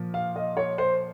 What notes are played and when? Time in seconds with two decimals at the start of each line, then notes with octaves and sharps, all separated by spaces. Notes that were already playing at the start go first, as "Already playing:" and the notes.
Already playing: A#2 F3
0.14 F5
0.36 D#5
0.57 C#5
0.78 C5